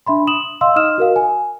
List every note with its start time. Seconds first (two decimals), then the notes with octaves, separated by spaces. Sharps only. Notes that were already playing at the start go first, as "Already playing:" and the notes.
0.06 D4 E5 B5 C6
0.27 D#6 E7 F#7
0.61 D#5 F5 C6 E6
0.76 D#4 D#5 D#6 F6 E7
0.98 F#4 A#4 F5
1.16 G#5